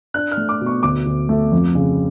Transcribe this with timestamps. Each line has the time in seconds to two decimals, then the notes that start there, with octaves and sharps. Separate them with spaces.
0.14 D4 F#6
0.31 F6
0.37 A3
0.49 D6
0.61 B2
0.66 C#6
0.83 D2 D6
1.06 D2
1.29 A3
1.52 F2
1.75 C#3